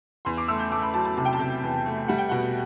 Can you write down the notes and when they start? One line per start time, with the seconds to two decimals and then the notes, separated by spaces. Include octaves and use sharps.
0.25 E2 C6
0.38 D6
0.48 A3 E6
0.60 G6
0.72 A3 D6
0.82 B5
0.94 F#3 A5
1.05 A5
1.17 C3 A5
1.25 G5
1.33 A5
1.39 C3
1.63 E2
1.85 A3
2.08 G3 F#5
2.18 G5
2.29 B2 F#5